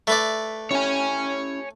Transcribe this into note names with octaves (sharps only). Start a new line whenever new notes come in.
A3 B4 D5 E5
C#4 E4 G4 C#5 G#5